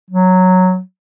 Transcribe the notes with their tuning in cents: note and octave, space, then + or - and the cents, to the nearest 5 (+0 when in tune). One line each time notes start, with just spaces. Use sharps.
F#3 -5